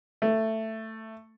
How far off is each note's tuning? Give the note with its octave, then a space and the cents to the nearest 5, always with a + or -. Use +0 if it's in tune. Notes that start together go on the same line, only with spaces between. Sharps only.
A3 +10